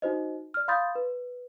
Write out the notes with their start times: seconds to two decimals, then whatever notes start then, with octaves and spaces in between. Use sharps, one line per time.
0.02 D#4 F#4 C5 D#5
0.54 D5 F6
0.68 F5 B5 C6 D#6 G6 A6
0.95 B4